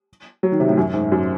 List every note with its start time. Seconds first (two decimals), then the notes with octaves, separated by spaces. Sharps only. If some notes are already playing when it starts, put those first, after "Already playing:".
0.43 F#3
0.52 D#3
0.60 C3
0.68 A2
0.77 F#2
0.94 G#2
1.12 F#2